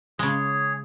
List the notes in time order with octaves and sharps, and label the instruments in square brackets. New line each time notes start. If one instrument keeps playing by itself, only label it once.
[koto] C#3 G#3 [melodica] G#4 C#5